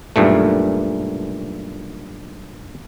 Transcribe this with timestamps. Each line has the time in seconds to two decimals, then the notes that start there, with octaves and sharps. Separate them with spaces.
0.16 B1 G2 A#2 A3